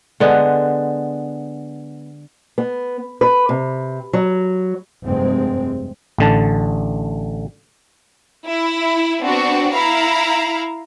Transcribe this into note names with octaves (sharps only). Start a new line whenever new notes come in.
D3 G#3 B3
B3
B4
C3
F#3
F1 G2 G#3 C4
A1 D3 A5
E4
B3 C4 D4 F#4
E4 F5 A#5